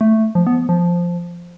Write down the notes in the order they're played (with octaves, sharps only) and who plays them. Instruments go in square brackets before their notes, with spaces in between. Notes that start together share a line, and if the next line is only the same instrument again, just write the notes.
[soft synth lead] A3
F3
B3
F3